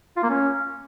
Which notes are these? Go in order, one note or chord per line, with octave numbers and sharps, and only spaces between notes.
F4
A#3
C#4